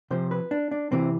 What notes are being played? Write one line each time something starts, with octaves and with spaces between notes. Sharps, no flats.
C3 F3 C5
B4
D4
D4
C3 E3 C4